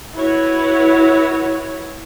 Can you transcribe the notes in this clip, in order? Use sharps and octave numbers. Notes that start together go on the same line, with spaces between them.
E4 F#4 B4 C#5